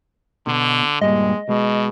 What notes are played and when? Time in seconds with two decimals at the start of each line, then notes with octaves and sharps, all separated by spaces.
0.47 B2 D3
1.01 G2 A#2 G#3 D#5
1.49 B2 G#3